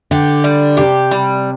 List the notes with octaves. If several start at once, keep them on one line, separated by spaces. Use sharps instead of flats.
D3 G4
G3
C3 G4
G3